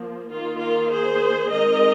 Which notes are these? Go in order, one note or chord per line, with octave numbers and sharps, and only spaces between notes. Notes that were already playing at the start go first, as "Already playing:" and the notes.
Already playing: F3 A#3
D#3 A#3 F4
F4 A#4
G#4 C5
D#3 G#3 C4 A#4 D#5